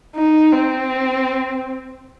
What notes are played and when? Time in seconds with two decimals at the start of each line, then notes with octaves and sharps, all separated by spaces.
0.16 D#4
0.53 C4